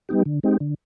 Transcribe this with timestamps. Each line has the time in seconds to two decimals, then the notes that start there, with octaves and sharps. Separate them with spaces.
0.09 G3 B3 D#4 G4
0.26 D3
0.43 G#3 C4 D#4 G4
0.60 D3